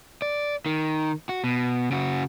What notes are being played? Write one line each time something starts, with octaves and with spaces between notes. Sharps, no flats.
D5
D#3
F#4
B2
C#3 F#4